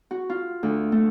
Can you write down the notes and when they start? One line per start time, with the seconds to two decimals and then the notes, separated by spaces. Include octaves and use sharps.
0.11 F#4
0.30 F4
0.63 D2
0.92 A3